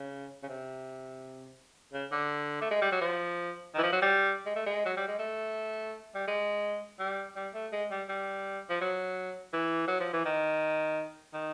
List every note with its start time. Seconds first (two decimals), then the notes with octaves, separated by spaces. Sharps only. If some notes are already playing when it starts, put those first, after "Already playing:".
Already playing: C#3
0.43 C#3
0.48 C3
1.93 C#3
2.12 D3
2.61 A3
2.71 G#3
2.82 G3
2.92 F#3
3.01 F3
3.74 D#3
3.78 E3
3.83 F3
3.92 F#3
4.02 G3
4.46 G#3
4.55 A3
4.66 G#3
4.86 F#3
4.97 G3
5.08 G#3
5.19 A3
6.15 G3
6.27 G#3
6.99 G3
7.36 G3
7.54 A3
7.73 G#3
7.91 G3
8.09 G3
8.70 F3
8.81 F#3
9.53 E3
9.87 F#3
10.00 F3
10.13 E3
10.25 D#3
11.33 D#3